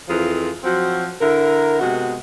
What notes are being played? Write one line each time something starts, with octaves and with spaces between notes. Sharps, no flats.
F2 E3 F3 F4 G#4
F3 F#3 C4 F#4
D3 E4 A#4
C3 G#3 B3 F#4